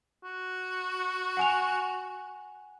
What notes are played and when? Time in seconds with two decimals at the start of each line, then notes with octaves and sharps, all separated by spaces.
0.23 F#4
1.37 F#5 G#5 F7